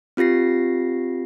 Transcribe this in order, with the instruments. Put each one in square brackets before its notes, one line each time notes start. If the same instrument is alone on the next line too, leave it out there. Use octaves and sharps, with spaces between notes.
[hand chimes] C4 F4 G4 A#6 C7